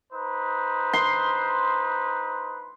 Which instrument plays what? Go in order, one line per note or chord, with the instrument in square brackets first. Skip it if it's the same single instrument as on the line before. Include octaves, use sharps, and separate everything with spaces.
[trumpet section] D#4 B4 C5
[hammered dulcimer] C6